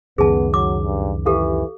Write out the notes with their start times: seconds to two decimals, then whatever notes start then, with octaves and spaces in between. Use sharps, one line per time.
0.18 C#2 F#2 D#3 B3 G#4 A5
0.54 F#3 D6
0.84 G2
1.26 E3 G4 A4 F5